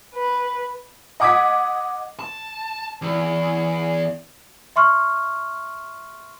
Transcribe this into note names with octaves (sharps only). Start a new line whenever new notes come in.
B4
D#5 F#5 D6 D#6 G#6 B6
A5
E2
E5 C6 C#6 F6